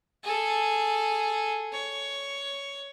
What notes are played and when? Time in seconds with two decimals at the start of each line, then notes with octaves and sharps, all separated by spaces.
0.23 G#4 A4
1.72 C#5